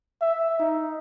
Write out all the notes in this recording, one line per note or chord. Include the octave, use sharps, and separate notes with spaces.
E5
D#4